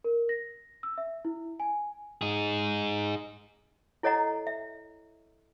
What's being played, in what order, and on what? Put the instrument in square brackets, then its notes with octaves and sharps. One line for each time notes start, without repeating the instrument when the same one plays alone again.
[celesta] A#4
A#6
E6
E5
E4
G#5
[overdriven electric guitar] D#4 G#4
[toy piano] E4 A4 C#5 D#5 F#5 A#5
E5